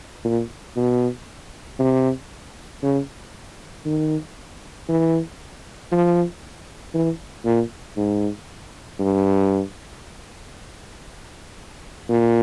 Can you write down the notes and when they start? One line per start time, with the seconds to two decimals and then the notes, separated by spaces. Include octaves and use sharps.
0.24 A#2
0.77 B2
1.79 C3
2.83 C#3
3.85 D#3
4.89 E3
5.92 F3
6.94 E3
7.45 A#2
7.97 G#2
9.00 G2
12.09 A#2